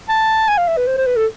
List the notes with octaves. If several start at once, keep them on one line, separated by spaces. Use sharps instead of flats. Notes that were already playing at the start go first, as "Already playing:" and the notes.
A5
G#5
F5
E5
B4
C5
C5
B4
A4